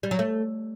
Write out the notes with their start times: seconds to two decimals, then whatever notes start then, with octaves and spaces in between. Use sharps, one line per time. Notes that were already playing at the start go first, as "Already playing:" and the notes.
0.03 G3
0.11 F#3
0.19 A3